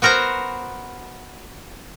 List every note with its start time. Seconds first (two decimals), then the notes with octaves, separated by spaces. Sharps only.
0.02 B3 F#4 A#4 C5 A#5